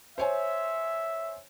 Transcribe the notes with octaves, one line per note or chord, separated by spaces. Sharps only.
C5 C#5 E5 G#5